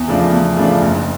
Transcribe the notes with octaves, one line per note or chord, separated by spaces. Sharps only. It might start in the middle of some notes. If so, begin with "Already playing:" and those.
Already playing: E2
C#3 F3 A3 D4
E2
C#3 F3 A3 D4
F#1